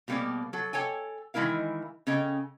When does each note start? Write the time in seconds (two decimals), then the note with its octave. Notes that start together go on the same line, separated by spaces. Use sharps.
0.08 B2 G3 A#3 C4 G#4 D5
0.53 F#3 A4
0.73 A4 C#5 G5 G#5
1.34 D#3 E3 G#3 E4 A#4 F5
2.07 C#3 C#4 A4 D#5 G5